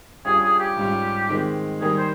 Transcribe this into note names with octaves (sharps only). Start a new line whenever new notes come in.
G2 G3 C#4 F4 G#4
G#4
G4
G#2 G3 C#4 F4
D#3 G#3 C4
D#3 G3 A#3 G#4
C5